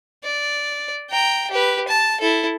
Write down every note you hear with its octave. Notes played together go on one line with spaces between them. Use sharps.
D5
G5 A#5
G4 B4
A5
E4 A4